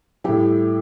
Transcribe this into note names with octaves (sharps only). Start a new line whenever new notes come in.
A2 G3 E4 G4